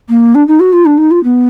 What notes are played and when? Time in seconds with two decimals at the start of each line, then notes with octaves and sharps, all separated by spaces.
0.09 A#3
0.35 D4
0.47 D#4
0.60 F#4
0.73 F4
0.85 D4
0.97 D#4
1.11 F4
1.24 B3